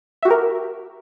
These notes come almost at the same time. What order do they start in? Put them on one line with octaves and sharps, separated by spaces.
E5 F#4 G4 A#4